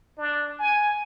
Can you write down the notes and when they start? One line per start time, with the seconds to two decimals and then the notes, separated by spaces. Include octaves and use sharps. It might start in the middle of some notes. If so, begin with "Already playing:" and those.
0.18 D4
0.59 G#5